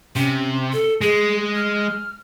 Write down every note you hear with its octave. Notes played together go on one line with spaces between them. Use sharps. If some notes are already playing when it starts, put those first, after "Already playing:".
C3 C#4
A4
G#3 G#4
F6